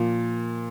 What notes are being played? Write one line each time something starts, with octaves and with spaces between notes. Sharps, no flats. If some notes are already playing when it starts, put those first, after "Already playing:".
Already playing: A#2 F3